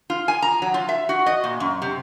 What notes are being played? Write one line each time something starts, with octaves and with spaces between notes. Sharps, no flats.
F4
G#5
A#5
F#3
F4
E5
F#4
D#5
A#2
F#2
C3